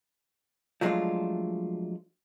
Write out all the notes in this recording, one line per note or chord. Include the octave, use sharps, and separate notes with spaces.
F3 F#3 G#3 A3 D4 F4